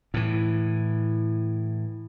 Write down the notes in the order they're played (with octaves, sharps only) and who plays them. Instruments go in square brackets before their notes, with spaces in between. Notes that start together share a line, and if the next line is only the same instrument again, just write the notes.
[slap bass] A2 E3